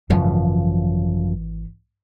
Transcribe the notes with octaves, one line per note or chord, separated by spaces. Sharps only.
G#1 F#2 C#3 E3 F3